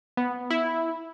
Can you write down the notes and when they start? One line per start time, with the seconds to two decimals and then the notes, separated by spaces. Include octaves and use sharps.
0.17 B3
0.50 E4